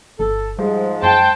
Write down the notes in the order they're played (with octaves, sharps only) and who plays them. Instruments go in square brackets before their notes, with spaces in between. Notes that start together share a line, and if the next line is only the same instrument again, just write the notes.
[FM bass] G1 [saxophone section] A4
[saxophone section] G#2 F3 G#3 [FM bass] G3
[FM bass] F#2 [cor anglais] C5 [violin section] G5 A5